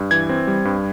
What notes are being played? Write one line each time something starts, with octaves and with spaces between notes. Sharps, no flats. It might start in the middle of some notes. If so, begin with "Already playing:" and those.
Already playing: G2
E3 G#6
C4
G3
G2